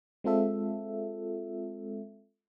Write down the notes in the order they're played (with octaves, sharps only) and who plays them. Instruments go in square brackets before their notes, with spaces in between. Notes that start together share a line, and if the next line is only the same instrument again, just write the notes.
[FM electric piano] G#3 C4 F4 A4 E5